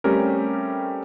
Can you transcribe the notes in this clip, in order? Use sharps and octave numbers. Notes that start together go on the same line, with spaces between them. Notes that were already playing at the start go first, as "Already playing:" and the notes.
G3 A3 C4 C#4 G4 A#4